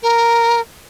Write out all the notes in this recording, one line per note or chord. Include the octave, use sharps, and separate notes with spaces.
A#4